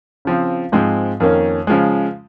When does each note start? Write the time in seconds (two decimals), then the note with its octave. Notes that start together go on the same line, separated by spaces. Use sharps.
0.25 C#3 F3 C4
0.72 G#2 F3 G#3 C4
1.20 F2 D#3 A#3 C#4
1.67 C#3 F3 G#3